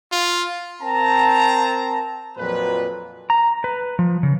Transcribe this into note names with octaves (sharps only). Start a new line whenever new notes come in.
F4
C4 A#4 G5 A5 A#5
F2 A#2 F3 F#3 B4
A#5
B4
F3
C#3